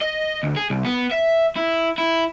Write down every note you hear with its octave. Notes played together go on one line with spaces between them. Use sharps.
D#5
D2
G#4
C2
B3
E5
E4
E4